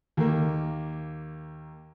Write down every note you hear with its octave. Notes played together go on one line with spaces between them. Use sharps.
D#2 A#3